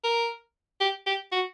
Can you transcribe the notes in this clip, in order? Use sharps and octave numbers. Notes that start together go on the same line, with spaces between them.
A#4
G4
G4
F#4